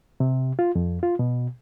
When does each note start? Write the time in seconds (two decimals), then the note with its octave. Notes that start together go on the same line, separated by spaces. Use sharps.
0.20 C3
0.59 F4
0.76 F2
1.03 F4
1.19 B2